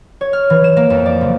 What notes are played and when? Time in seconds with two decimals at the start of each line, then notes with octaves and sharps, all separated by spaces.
0.21 C#5
0.33 F6
0.50 E3
0.64 E7
0.77 A#3
0.90 F2
1.06 D5
1.21 F#1